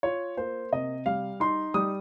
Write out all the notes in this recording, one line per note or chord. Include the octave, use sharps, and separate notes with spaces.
F4 C#5
A#3 C5
C3 D#5
G3 F5
D#4 C6
G3 D#6